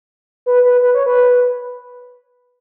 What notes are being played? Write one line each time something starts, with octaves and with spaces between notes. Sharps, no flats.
B4
B4
B4
C#5
B4